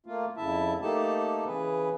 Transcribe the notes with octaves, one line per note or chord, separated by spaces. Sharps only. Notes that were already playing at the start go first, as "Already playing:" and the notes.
A3 A#3 F4
F2 C#3 E4 E5 A5
A3 A#3 D#4 G4 A4 A5
C#3 E3 G#4 B4